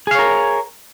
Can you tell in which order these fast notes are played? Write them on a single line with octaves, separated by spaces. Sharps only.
G#4 F5 C#5 A#4